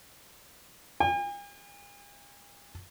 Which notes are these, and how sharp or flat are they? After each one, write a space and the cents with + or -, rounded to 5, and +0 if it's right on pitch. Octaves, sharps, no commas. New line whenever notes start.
G#5 -45